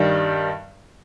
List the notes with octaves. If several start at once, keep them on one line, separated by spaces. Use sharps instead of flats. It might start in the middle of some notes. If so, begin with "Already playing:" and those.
Already playing: G2 D#3 G3